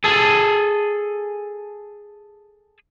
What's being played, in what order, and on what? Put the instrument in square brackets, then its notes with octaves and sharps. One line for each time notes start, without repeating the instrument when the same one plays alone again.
[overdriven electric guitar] G#4 A4